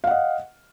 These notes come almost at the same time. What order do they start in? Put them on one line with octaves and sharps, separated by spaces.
F5 F#5 D#5